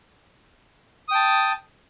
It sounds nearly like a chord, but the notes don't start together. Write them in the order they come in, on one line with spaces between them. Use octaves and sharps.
D#6 G5 A5